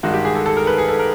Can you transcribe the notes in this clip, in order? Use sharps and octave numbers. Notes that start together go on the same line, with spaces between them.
G2 D#3 G#3 F#4
G4
G#4
A4
A4
A#4
B4
G#4
A4
A#4